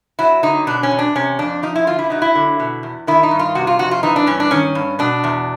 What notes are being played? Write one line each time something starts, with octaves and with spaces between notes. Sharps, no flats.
F#3 E4
D3 D#4
B2 D4
C#4
E2
D4
C3 C#4
F2 D4
F3 D#4
E4
D3 F4
E4
F#3 D#4
E4
D3
B2
E2
D#3 E4
D#4
G2
F4
C3 F#4
F4
F2 F#4
F4
E3 D#4
D4
G2 C#4
D4
D#3 C#4
G2
B2 D4
E2